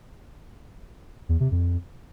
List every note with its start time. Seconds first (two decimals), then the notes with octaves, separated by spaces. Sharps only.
1.29 E2
1.40 C3
1.51 F2